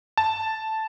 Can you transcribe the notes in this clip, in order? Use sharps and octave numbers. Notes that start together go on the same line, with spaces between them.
A5